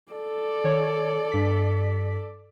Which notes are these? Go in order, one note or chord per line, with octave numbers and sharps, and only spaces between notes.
A4 D5
D#3 C#5
G2 B6